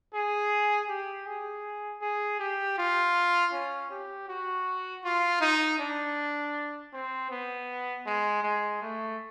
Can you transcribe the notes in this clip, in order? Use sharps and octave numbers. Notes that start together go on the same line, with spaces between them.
G#4
G4
G#4
G#4
G4
F4
C#4
G4
F#4
F4
D#4
D4
C4
B3
G#3
G#3
A3